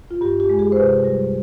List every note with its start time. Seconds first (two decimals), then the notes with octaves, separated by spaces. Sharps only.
0.11 F4
0.21 G2 G4
0.40 G4
0.50 G#3
0.59 G#4
0.72 C5
0.76 C3 B4
1.04 G3